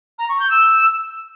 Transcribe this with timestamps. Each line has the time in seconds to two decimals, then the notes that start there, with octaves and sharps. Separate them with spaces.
0.18 A#5
0.29 C#6
0.39 G6
0.50 E6